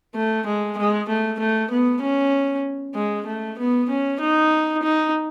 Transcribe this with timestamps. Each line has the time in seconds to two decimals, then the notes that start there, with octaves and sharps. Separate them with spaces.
0.15 A3
0.46 G#3
0.78 G#3
1.08 A3
1.39 A3
1.71 B3
2.02 C#4
2.95 G#3
3.27 A3
3.59 B3
3.89 C#4
4.20 D#4
4.83 D#4